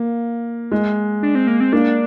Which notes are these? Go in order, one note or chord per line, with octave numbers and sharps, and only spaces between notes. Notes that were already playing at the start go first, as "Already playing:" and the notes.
Already playing: A#3
G#3
D4
C4
A#3
C4
A#3 D4